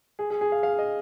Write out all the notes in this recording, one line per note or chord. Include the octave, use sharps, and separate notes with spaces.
G#4
G#4
G#4
F5
F5
D#5